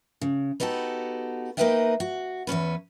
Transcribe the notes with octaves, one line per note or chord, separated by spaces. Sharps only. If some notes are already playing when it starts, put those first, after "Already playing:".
C#3
B3 D#4 F#4 G4 A4
A#3 D#4 B4 D#5 E5 G5
F#4
E2 G2 C#4 B4